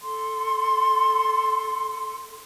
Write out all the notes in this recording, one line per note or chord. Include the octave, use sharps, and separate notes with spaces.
A4 C6